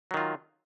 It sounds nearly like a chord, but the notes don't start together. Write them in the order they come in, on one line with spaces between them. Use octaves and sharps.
F#3 D#3 F4